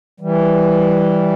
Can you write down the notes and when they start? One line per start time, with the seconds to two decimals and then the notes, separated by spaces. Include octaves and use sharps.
0.20 E3 G3